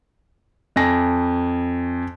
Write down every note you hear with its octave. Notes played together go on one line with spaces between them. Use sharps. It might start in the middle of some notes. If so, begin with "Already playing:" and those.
F2 G#5 A#6